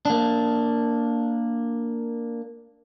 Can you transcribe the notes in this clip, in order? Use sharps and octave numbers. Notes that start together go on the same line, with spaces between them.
A#3 D4